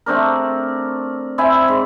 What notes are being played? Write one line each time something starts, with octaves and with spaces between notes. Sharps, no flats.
A3 C4 D4 A#4
C4 E4 E5 G#5
G#2